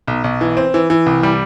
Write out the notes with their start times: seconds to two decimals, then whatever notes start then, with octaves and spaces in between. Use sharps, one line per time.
0.08 B1
0.24 B1
0.41 E3
0.57 C4
0.74 E3
0.90 E3
1.06 C2
1.23 G3